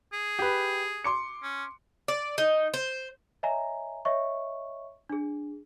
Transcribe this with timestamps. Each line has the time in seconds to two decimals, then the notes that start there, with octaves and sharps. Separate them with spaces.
0.13 G#4
0.39 G4 B4
1.04 C6 D6 C#7
1.43 C#4
2.08 D5
2.38 D#4
2.74 C5
3.43 C#5 D#5 E5 G#5 A#5
4.05 C#5 D#5 E5 C#6
5.09 D4 G#4